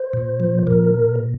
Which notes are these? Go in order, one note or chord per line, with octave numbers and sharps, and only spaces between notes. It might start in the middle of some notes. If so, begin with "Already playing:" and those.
Already playing: C5
A#2
F3
A#2 A#4